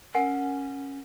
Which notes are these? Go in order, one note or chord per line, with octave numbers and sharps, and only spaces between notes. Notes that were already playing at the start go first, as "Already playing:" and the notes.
C#4 A#4 F#5 G#5